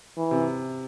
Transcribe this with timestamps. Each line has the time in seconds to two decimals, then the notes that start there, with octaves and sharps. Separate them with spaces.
0.17 E3
0.31 C3